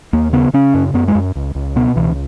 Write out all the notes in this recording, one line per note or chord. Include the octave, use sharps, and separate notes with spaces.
D#2 A#3
C#3 B3
C#3 C#4
F#2
F#2 B3
G#3
F#2
C#2
C#2
B2 B3
C#2 E3